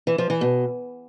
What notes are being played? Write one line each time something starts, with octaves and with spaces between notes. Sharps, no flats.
E3
F3
E3
B2